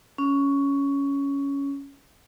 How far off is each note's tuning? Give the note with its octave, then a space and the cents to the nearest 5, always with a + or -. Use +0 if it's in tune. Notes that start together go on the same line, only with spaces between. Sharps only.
C#4 +10